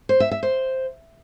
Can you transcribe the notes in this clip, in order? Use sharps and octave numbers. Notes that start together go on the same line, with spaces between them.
C5
E5
E5
C5